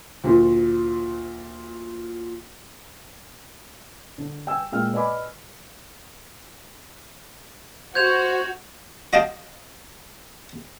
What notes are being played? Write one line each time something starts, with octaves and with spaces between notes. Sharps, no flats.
D2 A#2 F3
D3
G5 G#5 E6
A#2 G#3 G5 F6
B4 D5 D#5 G#5 B5 D6
F#4 C5 G6 G#6 F7
F#4 D#5 F5 G5 A5